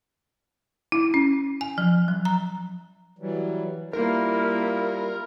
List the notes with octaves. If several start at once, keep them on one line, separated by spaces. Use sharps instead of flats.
E4
C#4
G#5
F3
F#3
A#5
E3 F#3 G3
G3 A#3 E4 F4 A#4